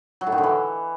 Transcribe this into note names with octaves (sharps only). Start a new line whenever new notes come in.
F#3
A2
D#3
D3
E3